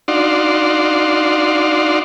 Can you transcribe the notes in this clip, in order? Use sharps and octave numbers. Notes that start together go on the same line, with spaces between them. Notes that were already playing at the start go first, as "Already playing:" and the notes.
D4 D#4 F#4 D5 F5 C6